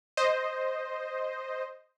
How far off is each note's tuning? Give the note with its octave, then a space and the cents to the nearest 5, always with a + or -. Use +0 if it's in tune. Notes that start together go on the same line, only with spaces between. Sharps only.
C5 +0 D#5 +0